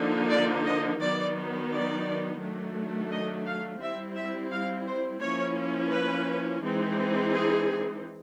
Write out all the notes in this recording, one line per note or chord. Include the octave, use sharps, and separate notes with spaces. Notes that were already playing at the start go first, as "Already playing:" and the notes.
Already playing: D3 F3 A#3 D#4
D5
D#5
D#3 F#3 B3 D#4 D5
D5
D#3 F#3 A3 D4
D#5
F5
G3 C4 E4 E5
E5
F5
C5
F3 A#3 C#4 E4 C#5
B4
E3 G#3 C4 D#4
G#4